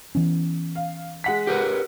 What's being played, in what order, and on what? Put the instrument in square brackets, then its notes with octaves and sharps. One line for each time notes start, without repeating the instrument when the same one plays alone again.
[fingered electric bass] E3 B3 C#4
[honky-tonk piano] F5
G#3 F#5 B6
[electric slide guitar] G4 A#4 B4